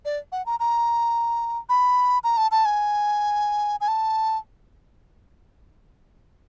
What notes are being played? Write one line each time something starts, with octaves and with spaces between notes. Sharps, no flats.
D5
F#5
A#5
A#5
B5
A#5
A5
A5
G#5
G#5
A5